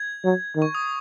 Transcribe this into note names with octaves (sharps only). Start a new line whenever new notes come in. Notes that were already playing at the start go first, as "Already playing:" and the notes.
Already playing: G#6
F#3
D#3
C#6
D#6